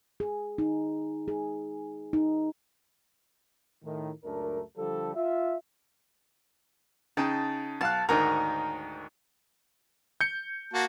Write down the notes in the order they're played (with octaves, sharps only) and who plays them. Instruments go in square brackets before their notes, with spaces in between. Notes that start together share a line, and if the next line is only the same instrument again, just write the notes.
[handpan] G#4
D#4
G#4
D#4
[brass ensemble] A2 D#3
C#2 F#2 A3 D4 A#4
D3 F3 G3 A4
F4 E5
[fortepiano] C#3 D#4 G5 [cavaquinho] A5
[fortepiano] B1 F5 F#6 [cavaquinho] A5
[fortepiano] D2 G#2 D#3 [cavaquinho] A#4 C#5 D#5
[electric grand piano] G6 C#7
[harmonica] A#3 F#4 A5